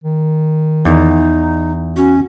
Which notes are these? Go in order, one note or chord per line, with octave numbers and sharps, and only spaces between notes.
D#3
E2 D#4
C#4 F#4